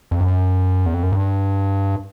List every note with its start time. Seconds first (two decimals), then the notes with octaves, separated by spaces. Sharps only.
0.11 F2
0.20 F#2
0.86 E2
0.94 F2
1.03 F#2
1.12 G2